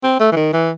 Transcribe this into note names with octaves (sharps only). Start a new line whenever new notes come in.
C4
A3
E3
D#3
E3